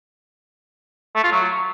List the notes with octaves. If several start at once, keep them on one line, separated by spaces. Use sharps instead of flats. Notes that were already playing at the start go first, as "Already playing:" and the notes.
A3
F4
F#3